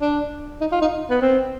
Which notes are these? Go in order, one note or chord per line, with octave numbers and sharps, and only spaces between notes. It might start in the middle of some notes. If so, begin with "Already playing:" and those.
D4
D#4
F4
D#4
B3
C4